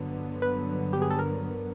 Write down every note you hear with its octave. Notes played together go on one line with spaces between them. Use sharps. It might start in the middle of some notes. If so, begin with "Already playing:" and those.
Already playing: G2 D3 F#3 B3
B4
G4
G#4
A4
A#4